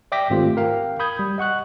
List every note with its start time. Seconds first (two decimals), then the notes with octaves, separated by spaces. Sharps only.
0.12 D5 E5 G5 D6 A#6 B6
0.30 G#2 D#3 A3 C4 F4 G4
0.57 A#4 F5 G5
0.99 B5 D#6 G6 G#6
1.19 G3
1.38 D#5 F#5 C#6 F#6